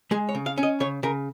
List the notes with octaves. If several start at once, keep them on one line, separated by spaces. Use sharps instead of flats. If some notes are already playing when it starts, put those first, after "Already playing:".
G#3 G#4
C#5
C#3
F5
C#4
D#5
C#3 C#5
C#3 A#4